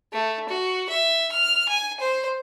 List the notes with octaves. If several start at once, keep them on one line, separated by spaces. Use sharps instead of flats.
A3
F#4
E5
F6
G#5
C5